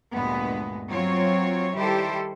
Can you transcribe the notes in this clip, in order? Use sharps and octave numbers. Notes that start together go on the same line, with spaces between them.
D2 G2 A#2 G#3 B3
F#3 C4 F4 C#5
D#3 G3 E4 G4 A4 C5